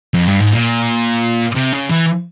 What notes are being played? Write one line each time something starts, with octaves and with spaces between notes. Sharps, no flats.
F2
G2
G#2
A#2
C3
C#3
E3